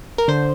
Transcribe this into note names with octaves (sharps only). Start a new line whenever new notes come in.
A#4
D3 C5